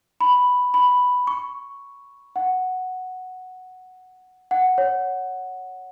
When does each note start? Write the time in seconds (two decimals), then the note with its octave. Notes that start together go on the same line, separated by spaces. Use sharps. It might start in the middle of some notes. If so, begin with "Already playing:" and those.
0.21 B5
0.74 B5
1.27 C#6
2.36 F#5
4.51 F#5
4.78 C#5